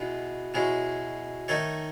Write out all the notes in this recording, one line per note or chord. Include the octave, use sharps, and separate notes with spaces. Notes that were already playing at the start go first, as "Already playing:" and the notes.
Already playing: B2 G#3 B3 E4
B2 G#3 C#4 E4
D#3 A3 D#4 A4 C#5